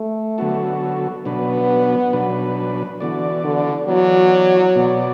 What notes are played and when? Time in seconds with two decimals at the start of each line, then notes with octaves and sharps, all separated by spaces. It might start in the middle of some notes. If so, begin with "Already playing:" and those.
Already playing: A3
0.38 D3 F#3 B3 F#4 A4
1.25 B2 F#3 B3 D4 B4
2.13 B2 F#3 D4 B4
3.00 D3 E3 B3 F#4 D5
3.44 D3
3.87 E3 F#3 B3 F#4 D5
4.76 B2 B3 F#4 D5